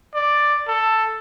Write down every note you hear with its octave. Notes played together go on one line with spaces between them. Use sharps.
D5
A4